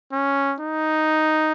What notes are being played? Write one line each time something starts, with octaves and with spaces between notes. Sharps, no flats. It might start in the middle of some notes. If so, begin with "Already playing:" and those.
C#4
D#4